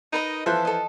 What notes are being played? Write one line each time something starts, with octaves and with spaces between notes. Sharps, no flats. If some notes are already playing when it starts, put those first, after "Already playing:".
D#4 A#4 B4 D#5
E3 F3 A4 C5 E5 F#6
A4 D#5